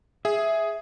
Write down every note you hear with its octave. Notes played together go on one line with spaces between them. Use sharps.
G#4 E5